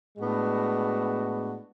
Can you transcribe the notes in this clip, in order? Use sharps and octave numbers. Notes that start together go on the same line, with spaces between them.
A2 G#3 B3 D4 F#4